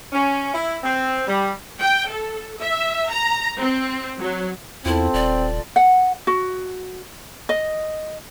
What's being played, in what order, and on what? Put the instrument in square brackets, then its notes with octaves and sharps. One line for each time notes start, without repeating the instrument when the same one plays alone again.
[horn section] C#4
E4
C4
G3
[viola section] G5
A4
E5
A#5
C4
F#3
[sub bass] E2 [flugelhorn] C4 [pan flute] E4 [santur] F4 A4
[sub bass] D#1 [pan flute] D5
[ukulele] F#5
F#4
D#5